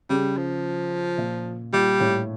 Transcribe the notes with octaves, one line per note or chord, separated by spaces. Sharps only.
C#3 G3
F3
A#2
A#2 G3
A2